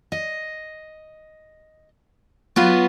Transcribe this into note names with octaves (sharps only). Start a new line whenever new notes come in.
D#5
F#3 B3 F4 B4